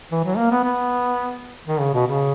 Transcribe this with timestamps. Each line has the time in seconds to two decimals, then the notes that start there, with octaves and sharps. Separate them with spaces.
0.12 E3
0.24 F#3
0.37 A#3
0.51 B3
0.63 B3
1.68 D#3
1.80 C#3
1.94 B2
2.07 C#3